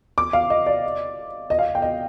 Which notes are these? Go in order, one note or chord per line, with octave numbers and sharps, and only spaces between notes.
D6
F5
D#5
D5
D#5
F5
G5
D#5